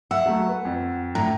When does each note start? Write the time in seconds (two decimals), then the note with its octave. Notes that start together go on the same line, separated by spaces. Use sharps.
0.11 E5 F#5 E6
0.26 F#3 A3
0.49 B4
0.65 F2
1.15 A2 D3 A#5